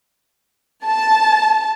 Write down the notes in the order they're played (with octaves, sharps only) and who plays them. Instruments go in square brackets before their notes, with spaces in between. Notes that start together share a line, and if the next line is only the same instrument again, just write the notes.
[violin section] A5